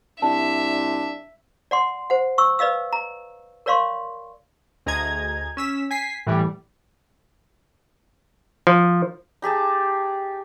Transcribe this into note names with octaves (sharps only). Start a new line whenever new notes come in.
C2 D4 E5 A5
D5 F#5 C6
C5 F#5
C#6 E6
B4 D5 D#5 F5 E6
A#5
A#4 C#5 D5 F5 C6 C#6
D2 G#4 D#5 A#5 G#6
C#4 E6 B6
G#5 B6 C7
A2 E3 G3
F3
D#4 G4 G#4 A5